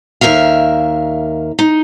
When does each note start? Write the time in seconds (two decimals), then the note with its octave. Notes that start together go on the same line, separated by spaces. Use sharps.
0.21 D#2 B2 A#4 E5 F5
1.59 D#4